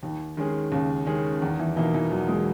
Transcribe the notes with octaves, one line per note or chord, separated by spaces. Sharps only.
D#2 D#3
D#3 G#3 C#4 G#4
D#2 C#3
D#3 G#3 C#4 G#4
E2 D#3
E3
B2 E3 A#3 D#4
E3
E2 F#3
G#3